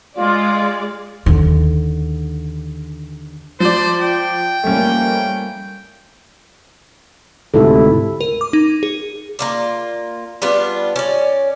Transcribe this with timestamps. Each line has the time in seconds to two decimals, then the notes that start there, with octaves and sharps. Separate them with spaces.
0.18 G#3 F4 D5
1.26 D#2 D3
3.60 F3 C5 D5
4.02 G5
4.63 F3 G3 A3 A#3 C#4
7.54 D2 G#2 C3 E4 A4
8.21 A#4
8.41 D6
8.53 D#4
8.83 G#4
9.39 A#3 F4 D5
10.42 G3 B3 D4 F4
10.96 C#4 D5